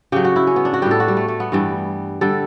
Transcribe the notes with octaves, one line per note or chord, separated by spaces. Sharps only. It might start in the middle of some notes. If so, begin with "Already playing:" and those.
C#3 F#3 G4
F#4
E4
C#4
B3
D4
F#4
A2 G3 G4
A4
F#4
G3
A3
A3
B3
G2 E3 G3
D3 G3 A4